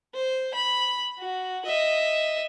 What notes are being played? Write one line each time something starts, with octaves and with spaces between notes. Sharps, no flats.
C5
B5
F#4
D#5 E5